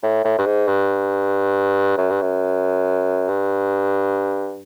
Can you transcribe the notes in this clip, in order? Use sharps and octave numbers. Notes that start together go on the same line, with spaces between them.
A2
A2
G2
G#2
G2
F#2
G2
F#2
G2